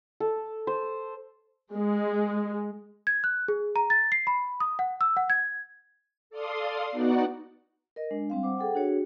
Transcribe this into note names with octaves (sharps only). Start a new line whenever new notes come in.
A4
C5
G#3
G#6
F#6
G#4
A#5
A6
C7
B5
D#6
F#5
E6
F#5
G#6
A4 D5 F5 C6 D#6
B3 D#4 F#4 D5 F#5
A#4 D#5
G#3 D4
G3 C4 F5
C5 F#5 D6
G#4 A4 F#5 G5
D4 F#4 G#4 C#5